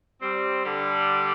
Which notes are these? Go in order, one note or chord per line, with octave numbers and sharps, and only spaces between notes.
G3 C4
D3 G3